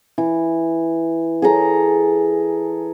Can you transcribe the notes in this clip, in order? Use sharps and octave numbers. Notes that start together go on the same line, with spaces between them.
E3
G#4 A4 A#5